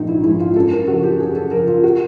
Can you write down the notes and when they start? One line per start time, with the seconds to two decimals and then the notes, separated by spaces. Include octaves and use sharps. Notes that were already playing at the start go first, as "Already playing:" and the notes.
Already playing: A#1 G#2 F3 D#4
0.08 E4
0.23 G#2 F3 E4
0.39 F4
0.56 F#2 A4
0.71 A#4
0.87 C#3 F3 F#4
1.04 G4
1.20 F#2 G#4
1.36 A4
1.51 C#3 F3 A#4
1.68 F4
1.83 F#4